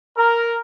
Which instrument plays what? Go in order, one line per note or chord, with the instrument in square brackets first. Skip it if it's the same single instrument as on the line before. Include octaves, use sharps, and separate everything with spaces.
[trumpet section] A#4